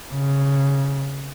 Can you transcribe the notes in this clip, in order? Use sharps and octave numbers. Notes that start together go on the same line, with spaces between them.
C#3